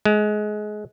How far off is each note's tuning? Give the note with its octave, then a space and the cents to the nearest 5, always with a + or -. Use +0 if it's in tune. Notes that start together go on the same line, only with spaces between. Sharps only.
G#3 +25